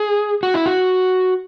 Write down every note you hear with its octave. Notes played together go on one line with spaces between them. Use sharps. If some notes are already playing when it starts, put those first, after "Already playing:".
Already playing: G#4
F#4
E4
F#4